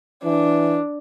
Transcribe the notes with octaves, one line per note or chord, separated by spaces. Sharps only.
E3 D4